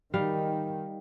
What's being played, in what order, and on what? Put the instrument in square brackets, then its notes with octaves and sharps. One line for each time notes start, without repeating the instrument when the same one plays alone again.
[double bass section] D#3 [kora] G3 F5